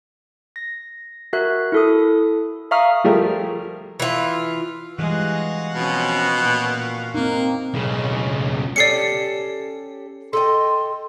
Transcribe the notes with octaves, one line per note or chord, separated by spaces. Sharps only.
A#6
F#4 A#4 E5 F#6
E4 A4 D#6
E5 F5 A#5 C#6 D#6 F6
F3 G3 A3 G#4 A#4
E3 F4
E3 G3 G#3 F#4 F5 F#5
B2 F3 C4 C#4
A#2
A#3 C4 D#4
B1 C#3
C#4 G4 A4 D5 C7 C#7
A4 D#5 G5 C6